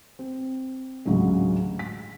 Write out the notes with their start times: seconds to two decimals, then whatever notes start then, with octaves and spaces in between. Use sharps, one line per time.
0.19 C4
1.05 A1 D2 C#3 F#3 G#3
1.79 B6